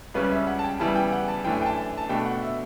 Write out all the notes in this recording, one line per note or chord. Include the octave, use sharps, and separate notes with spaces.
C#2 C#3 G3 C#4 B4
E5
F#5
A5
G5
C#3 E3 G3 B3 E4 A5
G5
F#5
A5
F#2 E3 A3 D4 G5
G5
A5
A5
B2 A3 D4 G5
F#5
E5